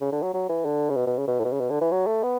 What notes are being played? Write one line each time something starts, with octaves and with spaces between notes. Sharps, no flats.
C#3
D3
F#3
F#3
E3
D3
C#3
B2
B2
C#3
B2
A2
B2
C#3
B2
D3
E3
F#3
A3
B3